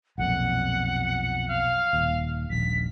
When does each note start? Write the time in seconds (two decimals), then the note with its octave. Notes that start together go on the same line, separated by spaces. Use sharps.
0.18 B1 F2 A#2 F#5
1.48 F5
1.93 D#1 D#2
2.50 D#1 A#1 B6